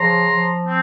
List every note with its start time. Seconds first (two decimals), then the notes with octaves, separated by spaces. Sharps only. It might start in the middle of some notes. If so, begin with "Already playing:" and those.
Already playing: C#3 F3 A#5 C6
0.30 F3
0.65 C4